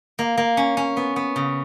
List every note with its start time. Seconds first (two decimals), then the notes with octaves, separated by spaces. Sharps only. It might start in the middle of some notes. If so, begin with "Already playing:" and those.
0.19 A#3
0.37 A#3
0.57 C#4
0.77 C#4
0.97 B3
1.16 B3
1.36 C#3